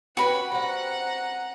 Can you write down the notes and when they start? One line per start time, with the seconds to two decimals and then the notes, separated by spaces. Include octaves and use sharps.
0.17 C#4 F#4 G4 B4 F#5 B5
0.52 G3 C4 F#5 A#5